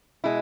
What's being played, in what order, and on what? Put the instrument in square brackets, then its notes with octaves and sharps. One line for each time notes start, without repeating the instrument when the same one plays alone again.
[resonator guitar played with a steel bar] B2 G#3 E4